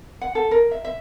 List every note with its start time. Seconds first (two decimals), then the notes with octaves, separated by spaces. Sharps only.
0.21 F#5
0.35 A4
0.51 A#4
0.71 E5
0.85 E5